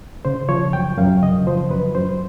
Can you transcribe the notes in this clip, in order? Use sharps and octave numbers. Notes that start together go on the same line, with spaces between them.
C#3 C5
F3 C#5
F#2 G5
F#2 F5
C#3 D#5
F3 C5
F#2 B4
F#2 C5